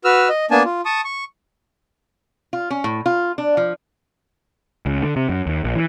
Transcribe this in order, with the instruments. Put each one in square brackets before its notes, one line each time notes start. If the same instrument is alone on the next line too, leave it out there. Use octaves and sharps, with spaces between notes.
[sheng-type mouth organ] F#4 B4 E6 F6
D#5
A#3 B3 D4 G#5 A5
F4
A5 C#6 D#6
C#6
[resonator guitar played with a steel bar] F4
C#4
A2
F4
D4
F3
[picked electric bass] C#2
D3
C3
F#2
D#2
A#1
E3